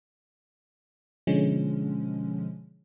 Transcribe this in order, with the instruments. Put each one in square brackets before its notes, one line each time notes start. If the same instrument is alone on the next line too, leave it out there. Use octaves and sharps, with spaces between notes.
[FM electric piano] B2 D3 F3 G#3 C#4